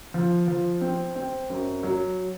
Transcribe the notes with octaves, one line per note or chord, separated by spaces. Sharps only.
F3
F3
C4
C4
F#2
F#3